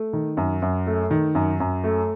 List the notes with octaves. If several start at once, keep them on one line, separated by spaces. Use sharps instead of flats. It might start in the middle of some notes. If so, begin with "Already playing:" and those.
Already playing: A3
D#3
F#2
F#2
A3
D#3
F#2
F#2
A3